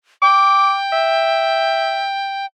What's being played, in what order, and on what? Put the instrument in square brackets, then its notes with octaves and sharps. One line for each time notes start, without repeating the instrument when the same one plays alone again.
[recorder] G5 [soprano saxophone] D6
[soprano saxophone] E5